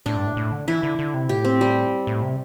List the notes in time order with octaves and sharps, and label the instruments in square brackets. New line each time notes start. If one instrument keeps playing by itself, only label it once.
[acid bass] A2 [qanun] D4
[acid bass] G2
A2
A2
D3
[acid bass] E3 [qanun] E4
[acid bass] D3
D3
C3
[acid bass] A2 [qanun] G4
[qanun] C4
G3
[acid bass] A2
C3